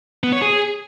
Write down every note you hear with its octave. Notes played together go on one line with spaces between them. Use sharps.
B3
C#5
G#4